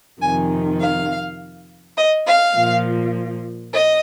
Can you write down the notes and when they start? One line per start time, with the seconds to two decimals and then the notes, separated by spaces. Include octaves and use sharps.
0.21 F2 C3 D#3 G#5
0.80 F5
1.97 D#5
2.26 F5
2.55 A#2 F3
3.72 D#5